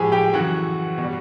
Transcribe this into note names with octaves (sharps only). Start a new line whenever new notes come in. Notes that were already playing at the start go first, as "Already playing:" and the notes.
Already playing: A2 F3 G#3 G4 G#4 G#5
G4 G5
F#2 C#3 E3 F#4 F#5
B2
G3